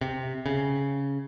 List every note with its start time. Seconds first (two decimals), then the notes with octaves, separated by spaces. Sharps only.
0.01 C3
0.46 C#3